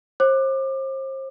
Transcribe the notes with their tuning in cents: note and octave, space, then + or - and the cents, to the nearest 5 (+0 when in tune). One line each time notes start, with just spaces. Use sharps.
C5 +35 D6 +25